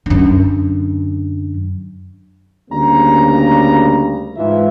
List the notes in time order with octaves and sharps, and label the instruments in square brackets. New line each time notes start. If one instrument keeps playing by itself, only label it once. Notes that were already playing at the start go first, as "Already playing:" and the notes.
[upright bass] F#2 D3
[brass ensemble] D2 C#3 G3 A#3 A#5
G#2 E3 F4 E5